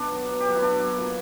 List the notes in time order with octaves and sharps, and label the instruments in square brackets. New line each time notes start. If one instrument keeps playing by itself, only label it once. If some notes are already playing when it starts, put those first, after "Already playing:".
Already playing: [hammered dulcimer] B2 B3 D4
F#3
B2
G4
F#3 F#4
E4
B2 D4
F#3
A#2